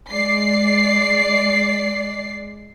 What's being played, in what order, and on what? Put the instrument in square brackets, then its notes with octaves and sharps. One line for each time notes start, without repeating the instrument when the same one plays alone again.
[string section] G#3 D5 C7